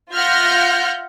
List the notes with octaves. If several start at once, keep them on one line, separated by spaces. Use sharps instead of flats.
F4 E5 F#5 F6 G6 A#6